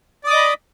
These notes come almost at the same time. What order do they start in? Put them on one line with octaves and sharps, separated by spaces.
D5 D#6 D6 D#5 B5